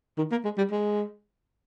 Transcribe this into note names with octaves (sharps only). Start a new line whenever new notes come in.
D#3
A#3
G#3
G3
G#3